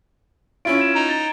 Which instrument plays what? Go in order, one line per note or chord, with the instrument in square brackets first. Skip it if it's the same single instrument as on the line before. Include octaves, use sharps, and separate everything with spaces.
[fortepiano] C#4 E4 F4 [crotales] D7
[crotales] G#6 E7
[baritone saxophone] D#4
[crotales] A6 G7